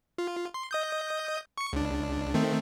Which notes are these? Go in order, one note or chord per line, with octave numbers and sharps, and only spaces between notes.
F4
C6
D#5 D#6 G6
C#6 C#7
C#2 D4
D#3 A3 C4